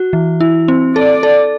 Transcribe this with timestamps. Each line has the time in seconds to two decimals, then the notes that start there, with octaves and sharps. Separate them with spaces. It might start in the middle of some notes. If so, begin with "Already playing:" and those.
Already playing: F#4
0.13 E3
0.40 E4
0.68 C4
0.95 A4 D5
1.23 A4